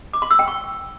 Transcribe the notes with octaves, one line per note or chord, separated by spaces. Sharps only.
D6
C6
E6
G5
C#6